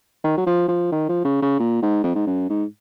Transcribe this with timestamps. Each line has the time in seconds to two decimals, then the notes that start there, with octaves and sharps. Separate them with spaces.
0.24 D#3
0.37 F#3
0.46 F3
0.68 F3
0.92 D#3
1.09 F3
1.25 C#3
1.42 C#3
1.60 A#2
1.82 G#2
2.04 F2
2.15 G#2
2.27 F#2
2.50 G#2